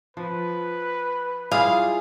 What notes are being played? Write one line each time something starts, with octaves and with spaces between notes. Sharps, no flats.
F3 B4
G3 E4 F4 G#4 F5